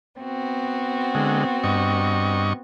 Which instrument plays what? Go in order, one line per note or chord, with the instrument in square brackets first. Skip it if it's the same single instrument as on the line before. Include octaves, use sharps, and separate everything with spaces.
[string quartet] B3 C4 F#4
[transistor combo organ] D3 G#3
G2 D#5 C#6